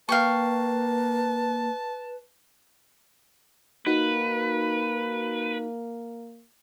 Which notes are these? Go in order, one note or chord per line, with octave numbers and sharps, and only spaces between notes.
A#3 B4 F5 G5 A5 C#6
A#3 D#4 F#4 B4